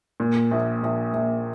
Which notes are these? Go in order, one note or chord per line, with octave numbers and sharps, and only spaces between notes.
A#2
A#1
A#1
A#1